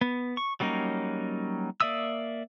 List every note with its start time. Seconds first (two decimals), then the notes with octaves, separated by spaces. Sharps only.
0.01 B3
0.37 C#6
0.60 F#3 G3 A#3 C#4 D#4
1.81 A#3 D5 E5 D#6 E6